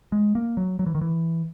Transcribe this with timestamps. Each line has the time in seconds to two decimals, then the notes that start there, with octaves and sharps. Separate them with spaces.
0.12 G#3
0.35 A#3
0.57 F#3
0.79 F#3
0.86 E3
0.95 D#3
1.01 E3